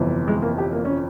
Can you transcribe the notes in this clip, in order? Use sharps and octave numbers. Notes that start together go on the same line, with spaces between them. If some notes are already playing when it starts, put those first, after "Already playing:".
Already playing: G1 F2 C3 E3
G#3
A#3
G4
A#3
C#4